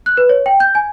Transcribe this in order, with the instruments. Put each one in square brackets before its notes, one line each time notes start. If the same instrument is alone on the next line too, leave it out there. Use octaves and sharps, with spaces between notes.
[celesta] F#6
B4
C#5
G5
G6
G#5